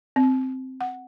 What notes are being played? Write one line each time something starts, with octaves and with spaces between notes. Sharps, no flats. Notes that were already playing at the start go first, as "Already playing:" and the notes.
C4
F#5